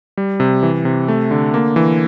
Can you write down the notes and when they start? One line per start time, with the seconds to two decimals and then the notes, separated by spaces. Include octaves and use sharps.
0.17 G3
0.40 C3
0.63 E3
0.85 C3
1.08 A3
1.31 D3
1.54 A#3
1.76 E3